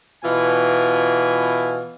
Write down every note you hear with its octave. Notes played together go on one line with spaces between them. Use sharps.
B2 E3 F4 G#5